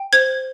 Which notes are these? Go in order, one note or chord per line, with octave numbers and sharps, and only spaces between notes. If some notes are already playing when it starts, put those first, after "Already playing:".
Already playing: G5
C5 G#6